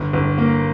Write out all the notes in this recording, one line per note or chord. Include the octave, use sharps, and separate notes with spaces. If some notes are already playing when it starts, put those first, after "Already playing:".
Already playing: G1
G1
A#3